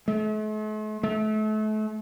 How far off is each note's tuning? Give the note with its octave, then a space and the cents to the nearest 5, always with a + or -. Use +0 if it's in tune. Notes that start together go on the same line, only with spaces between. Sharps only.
A3 -45
A3 -35